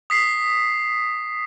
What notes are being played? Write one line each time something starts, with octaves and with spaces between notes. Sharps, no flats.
D#6 B6 C7